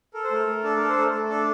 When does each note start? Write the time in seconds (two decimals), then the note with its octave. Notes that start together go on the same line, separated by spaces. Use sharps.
0.14 A4 A#4
0.24 C5
0.31 A3 A#4
0.47 A3
0.64 D4 A4
0.76 A4 A#4
0.88 C5
0.97 A3 A#4
1.10 A3 A4
1.29 D4 A4